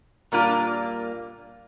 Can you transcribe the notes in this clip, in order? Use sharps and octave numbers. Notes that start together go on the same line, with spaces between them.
A#2 G3 A#3 D4 F4